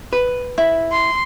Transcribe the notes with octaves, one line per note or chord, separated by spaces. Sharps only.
B4
E4
C6